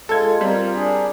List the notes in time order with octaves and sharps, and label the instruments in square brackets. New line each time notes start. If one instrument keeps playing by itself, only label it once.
[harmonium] G#3 F4 [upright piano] A4 G#6
[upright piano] G3 C4 A#4 [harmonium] F4
[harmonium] D4 G#4